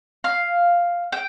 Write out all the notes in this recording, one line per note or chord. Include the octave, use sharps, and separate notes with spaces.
F5
G5